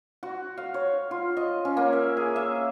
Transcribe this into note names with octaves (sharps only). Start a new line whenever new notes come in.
F#4
F5
C#5
F4
D#5
C#4
A#3
E5
G#4
E5